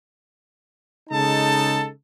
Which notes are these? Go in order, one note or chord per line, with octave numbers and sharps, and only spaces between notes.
C#3 G#3 D#4 A4 A5